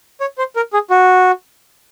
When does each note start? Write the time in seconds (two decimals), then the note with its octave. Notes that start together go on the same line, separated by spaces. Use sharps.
0.21 C#5
0.38 C5
0.56 A#4
0.73 G#4
0.90 F#4